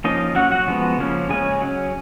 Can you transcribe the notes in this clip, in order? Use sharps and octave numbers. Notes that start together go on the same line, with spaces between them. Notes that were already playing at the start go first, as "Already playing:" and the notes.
F3 A#3 C#4 D#4 D#5
F#3 C#4 F#4 F#5
F#4 F#5
F3 G#3 B3
C#3 F3 A#3 C#4
C#3 G#3 C#4 G#4 G#5
F#3 C#4